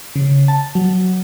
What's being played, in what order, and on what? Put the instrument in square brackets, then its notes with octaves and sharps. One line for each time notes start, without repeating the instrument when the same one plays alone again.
[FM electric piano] C#3
A5
F#3